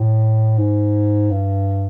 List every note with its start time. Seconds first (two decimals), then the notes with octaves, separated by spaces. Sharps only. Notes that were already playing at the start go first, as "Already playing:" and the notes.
Already playing: A2
0.58 G#2
1.31 G2